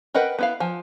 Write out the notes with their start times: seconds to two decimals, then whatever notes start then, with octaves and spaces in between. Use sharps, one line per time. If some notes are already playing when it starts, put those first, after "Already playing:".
0.14 A#4 B4 D#5 F#5 G5
0.39 B3 E4 F5
0.60 F3 G#5